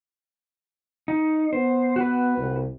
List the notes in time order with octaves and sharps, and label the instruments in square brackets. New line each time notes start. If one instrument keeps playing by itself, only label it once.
[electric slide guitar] D#4
[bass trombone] B3 [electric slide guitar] C5
[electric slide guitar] F#4 B4
[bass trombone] C2